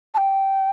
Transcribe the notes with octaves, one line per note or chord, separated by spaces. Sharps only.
A5
G5